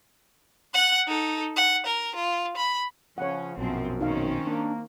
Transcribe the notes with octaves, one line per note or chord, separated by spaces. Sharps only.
F#5 F#6
D#4 A4
F#5
A#4
F4
B5
C#3 F3 C#4 C#5 F#5
A#1 F#2 B2 F3 C4
D#3 C4 C#4 D#4 F5
A#3 D4